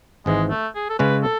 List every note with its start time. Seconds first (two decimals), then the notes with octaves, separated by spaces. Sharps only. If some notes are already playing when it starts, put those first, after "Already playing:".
0.26 G#1 G#2 E3 G#3
0.50 A3
0.76 G#4
0.90 A4
0.99 C#3 G#3 C#4 B4
1.23 A4